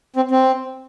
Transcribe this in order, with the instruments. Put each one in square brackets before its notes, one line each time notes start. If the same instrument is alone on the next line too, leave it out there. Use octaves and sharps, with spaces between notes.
[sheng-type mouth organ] C4
C4